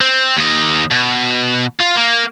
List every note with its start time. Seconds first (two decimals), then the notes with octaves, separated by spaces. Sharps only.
0.01 C4
0.37 D#2 D#5
0.91 B2
1.80 F4
1.96 A#3